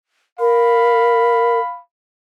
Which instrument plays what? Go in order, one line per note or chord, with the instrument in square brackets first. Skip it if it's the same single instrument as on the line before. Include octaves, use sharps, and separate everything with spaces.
[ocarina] A#4 [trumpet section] F5 B5